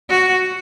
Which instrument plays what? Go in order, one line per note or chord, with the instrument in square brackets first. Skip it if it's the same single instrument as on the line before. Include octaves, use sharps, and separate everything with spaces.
[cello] F#4